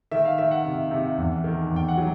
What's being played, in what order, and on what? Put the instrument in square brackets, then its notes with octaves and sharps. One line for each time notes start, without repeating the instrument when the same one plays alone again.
[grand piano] D#3 E5
F5
D#3 E5
F#5
C3
C3
E2
D#3
E2
G5
F#5
F#3